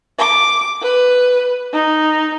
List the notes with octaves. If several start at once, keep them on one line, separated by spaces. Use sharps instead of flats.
D6
B4
D#4